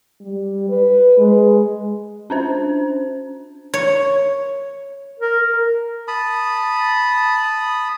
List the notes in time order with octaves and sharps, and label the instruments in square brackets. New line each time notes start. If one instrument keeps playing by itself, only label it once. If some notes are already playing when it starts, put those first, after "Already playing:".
[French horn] G3
B4
G#3
[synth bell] C#4 D4 C5
[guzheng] C#5
[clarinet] A#4
[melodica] A5 B5 D#6